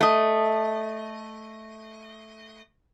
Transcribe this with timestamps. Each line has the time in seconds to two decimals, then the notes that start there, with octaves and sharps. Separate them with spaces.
0.01 A3 D#5